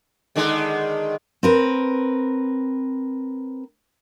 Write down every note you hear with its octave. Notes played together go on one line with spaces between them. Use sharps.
D3 D#3 G#3
C4 A#4 B4